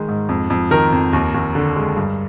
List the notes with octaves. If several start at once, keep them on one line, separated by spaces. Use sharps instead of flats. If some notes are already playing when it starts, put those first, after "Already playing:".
Already playing: D#3 G#3
G#2
F2
F2
D#3 A#4
F2
D#2
D#2
D3
G#3
G2